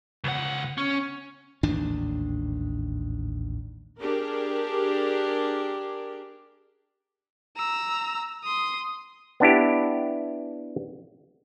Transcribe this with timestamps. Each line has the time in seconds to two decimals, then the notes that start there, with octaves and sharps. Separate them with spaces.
0.24 C#2 F#5
0.78 C#4
1.63 A1 D#2 G#2 D4
4.00 D4 G4 G#4 A#4
7.57 A#5 E6
8.44 C6 D#6
9.40 B3 D4 E4 G4